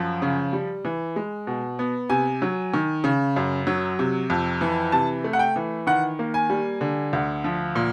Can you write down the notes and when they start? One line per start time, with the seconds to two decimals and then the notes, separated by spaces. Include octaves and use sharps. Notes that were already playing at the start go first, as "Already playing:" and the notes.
Already playing: F#2 F3
0.22 C#3
0.53 G3
0.85 E3
1.16 G#3
1.47 B2
1.79 B3
2.10 C3 G#5
2.42 F#3
2.74 D#3
3.04 C#3
3.36 F#2
3.67 F#3
3.99 C3
4.30 F2
4.61 E3
4.92 C3 A5
5.24 A3
5.33 F#5
5.39 G5
5.56 E3
5.87 D#3 F#5
6.19 A#3
6.34 G#5
6.50 G3
6.81 D3
7.13 D2
7.44 F3
7.75 A#2